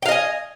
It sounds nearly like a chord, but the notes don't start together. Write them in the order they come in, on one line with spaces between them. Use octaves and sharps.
G5 F5 D#5 G#5